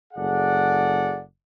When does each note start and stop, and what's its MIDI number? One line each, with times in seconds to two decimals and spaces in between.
0.14 1.21 30
0.14 1.21 68
0.14 1.21 69
0.14 1.21 74
0.14 1.21 78